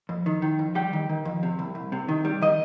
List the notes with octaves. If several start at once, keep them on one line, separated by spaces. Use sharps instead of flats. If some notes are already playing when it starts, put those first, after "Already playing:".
F2
D#3
D#3
F2
G3 G5
D#3
D#3
F2
C3
C2
C2
C3
D#3
G3
D#3 D#5